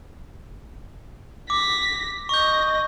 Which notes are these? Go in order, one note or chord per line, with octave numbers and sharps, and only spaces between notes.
D6 A#6 B6
D#5 C#6 G6 A#6